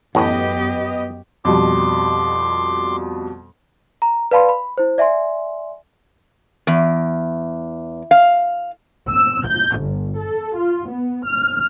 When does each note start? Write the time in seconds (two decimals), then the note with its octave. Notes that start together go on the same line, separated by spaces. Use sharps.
0.15 A1 F#2 A2 B3 G4 D#5
1.45 F2 B2 G3 C6 D6
4.02 A#5
4.31 B4 D5 F5 A5 B5 C6
4.49 B5
4.78 E4 C5
4.98 D5 E5 G#5 C6
6.67 E2
8.11 F5
9.09 E6
9.47 G6
9.79 G1
10.19 A4
10.57 F4
10.90 B3
11.26 F6